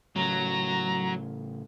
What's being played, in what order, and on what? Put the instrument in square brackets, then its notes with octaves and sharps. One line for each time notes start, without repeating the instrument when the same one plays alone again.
[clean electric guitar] A2 C#3 [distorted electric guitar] F#3 [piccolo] A#5